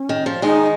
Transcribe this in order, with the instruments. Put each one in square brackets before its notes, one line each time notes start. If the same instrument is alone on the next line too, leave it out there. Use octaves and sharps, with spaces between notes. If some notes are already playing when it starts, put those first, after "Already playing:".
Already playing: [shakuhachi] C#4
[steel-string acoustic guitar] D#3
F3
[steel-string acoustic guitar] D#3 G#3 [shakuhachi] D#4